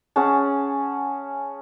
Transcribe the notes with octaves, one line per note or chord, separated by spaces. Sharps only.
C#4 G#4 F#5 A5